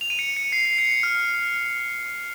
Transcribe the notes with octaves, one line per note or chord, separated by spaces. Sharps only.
F7
D#7
C#7
C#7
C7
C7
C#7
C#7
F6